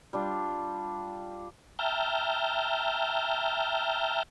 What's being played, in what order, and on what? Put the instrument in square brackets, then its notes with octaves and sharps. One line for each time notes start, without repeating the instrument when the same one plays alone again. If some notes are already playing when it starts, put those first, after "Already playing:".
[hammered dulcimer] G3 D4 F4
[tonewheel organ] E5 G5 A5 A#5 F6 G6